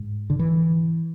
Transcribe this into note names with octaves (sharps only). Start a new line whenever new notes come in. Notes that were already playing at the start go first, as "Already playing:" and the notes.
Already playing: G#2
D3
E3